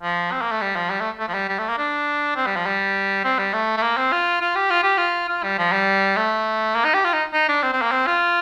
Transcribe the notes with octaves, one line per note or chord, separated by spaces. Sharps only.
F3
C4
A#3
A3
G3
F3
G3
A3
A3
F3
G3
G3
A3
A#3
D4
C4
G3
F3
G3
C4
G3
A3
A3
A#3
C4
F4
F4
G4
F4
G4
F4
F4
G3
F3
G3
A3
A#3
D#4
G4
F4
D#4
D#4
D4
C4
C4
A#3
C4
F4